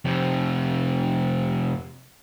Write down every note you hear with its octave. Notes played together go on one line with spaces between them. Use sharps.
F2 C3